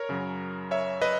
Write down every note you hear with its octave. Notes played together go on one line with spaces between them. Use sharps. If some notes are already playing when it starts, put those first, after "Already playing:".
Already playing: A#4 C#5
F#2 C#3 F#3
C#5 E5
B4 D#5